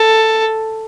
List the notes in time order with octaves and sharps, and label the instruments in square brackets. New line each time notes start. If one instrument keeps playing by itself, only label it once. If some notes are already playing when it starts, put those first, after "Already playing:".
Already playing: [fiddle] A4